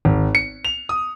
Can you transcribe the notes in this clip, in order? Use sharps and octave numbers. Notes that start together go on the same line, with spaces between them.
G#1
C#7
F7
D#6